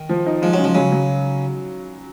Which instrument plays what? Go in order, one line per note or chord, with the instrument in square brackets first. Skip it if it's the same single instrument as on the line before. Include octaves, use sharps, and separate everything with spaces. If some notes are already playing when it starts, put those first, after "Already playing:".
Already playing: [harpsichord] D#3
[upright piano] F3
D#4
[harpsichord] F3 [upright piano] G#3
[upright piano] C#3 [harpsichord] F#3
[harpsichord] F3
[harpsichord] C#3 [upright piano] F#3
[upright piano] F#3